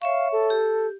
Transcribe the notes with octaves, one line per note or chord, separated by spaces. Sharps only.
C#5 E5 F5 C#6
A4
G4